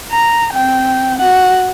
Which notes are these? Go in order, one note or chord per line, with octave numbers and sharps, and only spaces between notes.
A#5
C4 G5
F#4 F#5